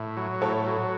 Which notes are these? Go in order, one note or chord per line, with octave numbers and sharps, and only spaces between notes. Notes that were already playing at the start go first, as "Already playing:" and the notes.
Already playing: A2 E5
F#3
A2 A4 C#5
F#3